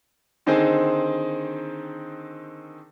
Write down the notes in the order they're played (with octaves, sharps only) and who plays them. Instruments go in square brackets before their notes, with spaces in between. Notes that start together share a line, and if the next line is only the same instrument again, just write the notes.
[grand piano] D3 D#3 C4 D#4 G#4 C5